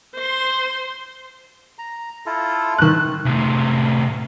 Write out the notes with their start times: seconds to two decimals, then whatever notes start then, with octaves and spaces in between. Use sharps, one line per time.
0.14 C5 C6
1.79 A#5
2.26 E4 F4 A4
2.78 D#3 F#6
3.25 A2 C3